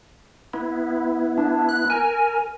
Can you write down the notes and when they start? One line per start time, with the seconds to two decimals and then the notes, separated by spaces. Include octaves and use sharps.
0.54 B3 E4
1.38 D4
1.69 F#6
1.90 A#4 G#5